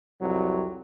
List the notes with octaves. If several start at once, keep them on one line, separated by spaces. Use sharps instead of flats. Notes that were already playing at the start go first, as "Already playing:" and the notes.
C2 F2 F#3